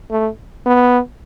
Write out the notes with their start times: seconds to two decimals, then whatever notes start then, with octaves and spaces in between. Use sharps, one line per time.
0.11 A3
0.66 B3